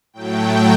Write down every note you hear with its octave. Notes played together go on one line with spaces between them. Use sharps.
A2 F#3 A3 G5